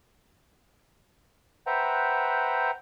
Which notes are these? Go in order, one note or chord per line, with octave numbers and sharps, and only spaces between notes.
B4 C5 E5 F#5 G5 A#5